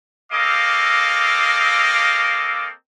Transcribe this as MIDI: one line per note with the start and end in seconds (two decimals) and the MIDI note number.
0.32 2.69 58
0.32 2.69 60
0.32 2.69 69
0.32 2.69 75
0.32 2.69 77
0.32 2.69 86